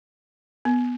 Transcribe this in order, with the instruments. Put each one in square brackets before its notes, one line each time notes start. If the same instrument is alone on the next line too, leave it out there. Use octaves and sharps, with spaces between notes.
[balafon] B3